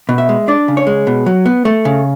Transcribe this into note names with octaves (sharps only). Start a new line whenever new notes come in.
B2
E5
G#3
D4 D5
C#3
C#5
G#3
B2
F#3
B3
A3
C#3